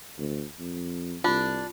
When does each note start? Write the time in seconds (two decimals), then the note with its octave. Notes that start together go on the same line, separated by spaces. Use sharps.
0.19 D2
0.59 F2
1.24 C2 D4 F4